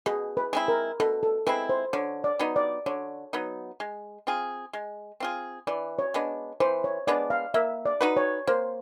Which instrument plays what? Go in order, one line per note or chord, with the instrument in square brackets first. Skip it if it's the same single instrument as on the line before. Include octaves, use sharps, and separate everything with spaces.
[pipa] B2 [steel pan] G#4
[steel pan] B4
[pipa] G#3 C4 E4
[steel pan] A#4
[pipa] B2 [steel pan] A4
[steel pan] A4
[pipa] G#3 C4 E4 [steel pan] B4
[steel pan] C5
[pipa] D3 [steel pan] C#5
[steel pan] D5
[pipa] F#3 B3 D#4
[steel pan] D5
[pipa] D3 [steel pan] C#5
[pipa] F#3 B3 D#4
G#3
C4 F4 G#4
G#3
C4 F4 G#4
[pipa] E3 [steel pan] D5
[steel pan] C#5
[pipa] G#3 B3 D4
[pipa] E3 [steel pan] C5
[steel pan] C#5
[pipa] G#3 B3 D4 [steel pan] D5
[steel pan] F5
[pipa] A#3 [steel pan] E5
[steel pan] D5
[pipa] D#4 F#4 B4
[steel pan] C#5
[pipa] A#3 [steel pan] C5